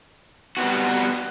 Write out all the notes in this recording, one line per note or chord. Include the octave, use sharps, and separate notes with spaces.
G3 B3 C4 F#4